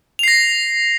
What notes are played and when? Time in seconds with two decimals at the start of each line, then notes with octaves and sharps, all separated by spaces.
0.19 F7
0.23 C7
0.28 A#6